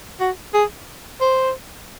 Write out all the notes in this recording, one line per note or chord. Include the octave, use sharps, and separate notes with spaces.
F#4
G#4
C5